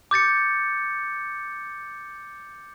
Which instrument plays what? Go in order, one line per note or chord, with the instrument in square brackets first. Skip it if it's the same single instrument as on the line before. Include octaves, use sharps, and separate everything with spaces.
[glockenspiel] D6 G6 A6 C#7